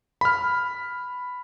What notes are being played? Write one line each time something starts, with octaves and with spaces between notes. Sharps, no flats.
B5 F6